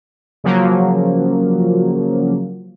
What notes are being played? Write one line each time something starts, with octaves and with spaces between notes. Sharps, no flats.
C#3 F3 F#3 A#3